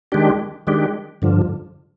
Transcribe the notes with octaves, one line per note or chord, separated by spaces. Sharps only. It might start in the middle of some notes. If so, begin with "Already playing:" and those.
D#3 G#3 D4 G4
D#3 G#3 D4 G4
G2 D3 F3